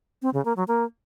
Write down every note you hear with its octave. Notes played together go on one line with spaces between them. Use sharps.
C4
C#3
A#3
F#3
A#3